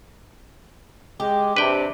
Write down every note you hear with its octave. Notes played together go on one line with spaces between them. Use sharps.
G#3 G4
C3 D4 B4 G5